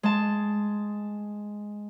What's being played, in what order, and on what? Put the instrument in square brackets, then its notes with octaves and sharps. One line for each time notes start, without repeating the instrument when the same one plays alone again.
[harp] G#3 A5